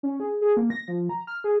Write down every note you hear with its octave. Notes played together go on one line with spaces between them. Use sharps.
C#4
G#4
G#4
A#3
A#6
F3
A#5
F6
G#4